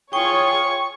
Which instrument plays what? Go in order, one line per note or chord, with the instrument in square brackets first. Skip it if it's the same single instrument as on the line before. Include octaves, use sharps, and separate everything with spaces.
[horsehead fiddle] F4 G#4 [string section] C#5 [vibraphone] G5 [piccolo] C#6